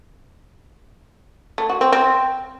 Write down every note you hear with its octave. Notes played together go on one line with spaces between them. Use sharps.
A3
F#4
C4
C4